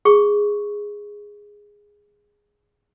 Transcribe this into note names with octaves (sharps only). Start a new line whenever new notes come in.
G#4 C#6